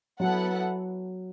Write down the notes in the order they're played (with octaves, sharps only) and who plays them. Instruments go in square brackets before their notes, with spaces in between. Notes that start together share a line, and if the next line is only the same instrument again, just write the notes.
[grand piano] F#3 [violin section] B3 E4 A4 F#5